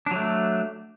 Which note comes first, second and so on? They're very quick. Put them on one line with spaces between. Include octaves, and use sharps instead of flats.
D4 F#3 A3